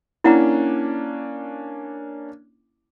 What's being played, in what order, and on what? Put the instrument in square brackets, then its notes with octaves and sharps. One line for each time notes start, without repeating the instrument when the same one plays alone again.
[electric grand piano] A#3 C#4 D4 [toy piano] E4 F#5 A#5